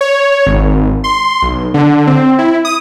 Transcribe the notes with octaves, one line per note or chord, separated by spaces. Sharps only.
C#5
G#1
C6
B1
D3
C4
E4
D#6